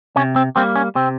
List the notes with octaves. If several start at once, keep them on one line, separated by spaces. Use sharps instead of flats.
C3 C#4
C4
G3 A#3 C4
C#4
C3 C4